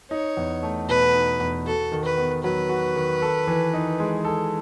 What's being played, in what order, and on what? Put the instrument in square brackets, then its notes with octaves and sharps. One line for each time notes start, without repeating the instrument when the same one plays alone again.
[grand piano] D#4 [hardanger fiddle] C#5
[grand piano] E2
A3
[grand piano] B2 [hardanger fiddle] B4
[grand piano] D#4
E2
[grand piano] F#4 [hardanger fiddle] A4
[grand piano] D#3
[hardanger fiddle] B4
[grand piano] B3
[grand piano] F#3 [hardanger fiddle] B4
[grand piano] F#4
D#3
A4
E3
D#4
G#3
A4